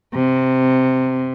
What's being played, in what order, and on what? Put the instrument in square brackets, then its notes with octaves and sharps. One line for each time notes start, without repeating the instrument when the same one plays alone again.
[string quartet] C3